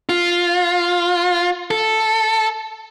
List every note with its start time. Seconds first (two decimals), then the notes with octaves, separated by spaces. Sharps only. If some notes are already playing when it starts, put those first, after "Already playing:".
0.09 F4
1.71 A4